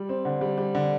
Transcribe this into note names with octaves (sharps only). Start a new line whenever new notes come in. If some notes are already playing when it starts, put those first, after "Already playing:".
Already playing: G3
C4
D3
G3
G3
D3